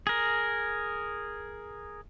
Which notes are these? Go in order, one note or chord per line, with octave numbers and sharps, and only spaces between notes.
G#4 A#4